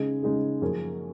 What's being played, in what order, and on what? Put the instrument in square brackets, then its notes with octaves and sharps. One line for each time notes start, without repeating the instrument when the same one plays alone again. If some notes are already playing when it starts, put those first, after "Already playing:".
Already playing: [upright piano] C#3 G#3 D#4 G#4
C#3 G#3 D#4 G#4
F#2 F3 A#3 C#4 G#4